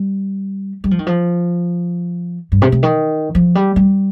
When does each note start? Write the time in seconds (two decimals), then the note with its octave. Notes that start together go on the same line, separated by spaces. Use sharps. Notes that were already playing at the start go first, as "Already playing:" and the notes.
Already playing: G3
0.84 G3
0.91 F3
0.99 D#3
1.07 F3
2.52 G2
2.62 C3
2.72 C3
2.83 D#3
3.35 F3
3.55 G3
3.76 G3